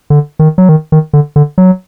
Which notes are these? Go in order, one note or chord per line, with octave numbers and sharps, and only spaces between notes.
D3
D#3
F#3
D#3
D#3
D3
D3
F#3